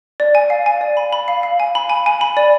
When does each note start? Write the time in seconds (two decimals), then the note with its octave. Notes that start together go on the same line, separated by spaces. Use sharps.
0.20 D5
0.35 G#5
0.50 F5
0.66 G#5
0.81 D5
0.97 B5
1.13 B5
1.28 F5
1.43 F5
1.60 G#5
1.75 B5
1.90 G#5
2.06 G#5
2.21 B5
2.37 D5